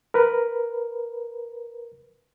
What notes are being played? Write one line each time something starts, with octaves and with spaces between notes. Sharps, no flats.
A#4 B4